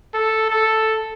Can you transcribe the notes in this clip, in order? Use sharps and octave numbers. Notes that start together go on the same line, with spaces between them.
A4
A4